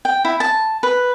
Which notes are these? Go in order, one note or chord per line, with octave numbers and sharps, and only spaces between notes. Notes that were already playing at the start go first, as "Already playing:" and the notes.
G5
E4
A5
B4